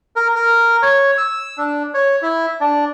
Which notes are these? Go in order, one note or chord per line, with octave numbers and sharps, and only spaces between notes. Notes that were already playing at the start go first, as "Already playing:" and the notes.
A#4
A#4
C#5
E6
D4
C#5
E4
D4